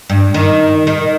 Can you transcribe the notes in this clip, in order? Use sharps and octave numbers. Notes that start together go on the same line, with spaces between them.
G2
D#3
D#3